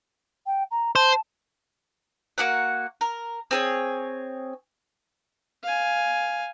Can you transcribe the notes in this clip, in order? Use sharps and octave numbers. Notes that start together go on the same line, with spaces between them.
G5
A#5
C5 A5
A#3 F#4 F#5
A#4
C4 G#4 C#5
F5 G#5